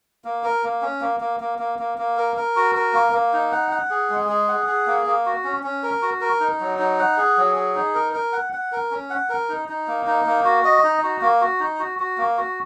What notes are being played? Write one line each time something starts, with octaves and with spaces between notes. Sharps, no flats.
A#3
A#4
A#3
C#4
A#3
A#3
A#3
A#3
A#3
A#3
A#4
A#4
F#4
A#4
A#3
A#3
D#4
F#5
F#5
G#4
G#3
G#4
F#5
G#4
A#3
A#3
F#4
C#4
C#4
A#4
F#4
A#4
D#4
F#3
D#4
F#5
G#4
F#3
G#4
D#4
A#4
A#4
F#5
F#5
A#4
C#4
F#5
A#4
D#4
D#4
A#3
D#4
A#3
F#4
D#5
D#4
F#4
A#3
F#4
D#4
F#4
F#4
A#3
F#4